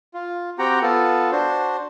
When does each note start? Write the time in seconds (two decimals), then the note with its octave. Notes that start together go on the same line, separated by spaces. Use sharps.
0.14 F4
0.59 C4 F#4 G4 F#5 G5 A#5
0.82 B3 F4 A4
1.32 D4 F#4 C5